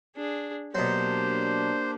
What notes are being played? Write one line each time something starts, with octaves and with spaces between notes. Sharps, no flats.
D4 G#4
B2 F#3 A#3 D4 G4 C5